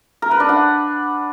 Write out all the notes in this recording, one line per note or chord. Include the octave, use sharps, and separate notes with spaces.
A#4
B4
D4
F#5